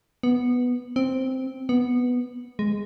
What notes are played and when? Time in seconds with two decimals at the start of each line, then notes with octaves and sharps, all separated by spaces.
0.23 B3
0.96 C4
1.69 B3
2.59 G#3